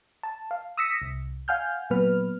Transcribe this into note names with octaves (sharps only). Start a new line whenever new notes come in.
A5
F5
D#6 E6 A#6 B6 C#7
C2
F5 F#5 G#5 F6 G6
A#2 F#3 B3 B4 F6